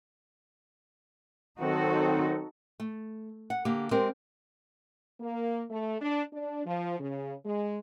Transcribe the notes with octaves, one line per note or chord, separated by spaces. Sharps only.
D#3 F#3 C4 D#4 F#4 A4
A3
F#5
D3 A#3 G4
G#3 C4 G4 A#4
A#3
A3
D4
D4
F3
C#3
G#3